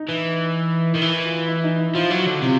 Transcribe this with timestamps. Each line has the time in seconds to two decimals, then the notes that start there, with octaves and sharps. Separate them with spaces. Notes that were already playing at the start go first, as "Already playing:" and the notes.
Already playing: D#4
0.09 E3
0.95 D#3
1.02 E3 E4
1.25 F4
1.48 E4
1.64 D#4
1.80 E4
1.94 F3 F4
2.11 F#3
2.19 F#4
2.26 D3
2.42 C3 F4